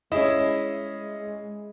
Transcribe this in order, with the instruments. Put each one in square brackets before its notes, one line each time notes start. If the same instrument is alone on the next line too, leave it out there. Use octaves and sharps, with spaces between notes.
[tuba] G#3 [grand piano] C#4 G#4 D#5 [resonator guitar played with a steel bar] E4